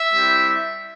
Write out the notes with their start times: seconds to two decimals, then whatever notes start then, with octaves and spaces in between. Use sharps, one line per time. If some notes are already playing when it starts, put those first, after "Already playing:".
Already playing: E5
0.13 G3 C4 E4 G4